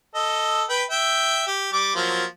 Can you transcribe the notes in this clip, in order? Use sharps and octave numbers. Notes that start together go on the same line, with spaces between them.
A4 D#5
B4 G5 B5
E5 G5
G4
G3 D6
F3 F#3 A#3